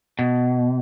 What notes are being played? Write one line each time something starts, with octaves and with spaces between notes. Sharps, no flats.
B2